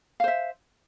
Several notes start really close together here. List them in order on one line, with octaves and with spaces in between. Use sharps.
F5 C5 E5